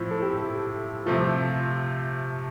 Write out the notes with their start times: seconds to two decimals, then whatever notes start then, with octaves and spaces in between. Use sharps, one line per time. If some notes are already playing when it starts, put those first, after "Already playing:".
Already playing: A2 F3 C4 E4 F4
0.11 A4
0.22 G4
1.06 C3 F3 A3 F4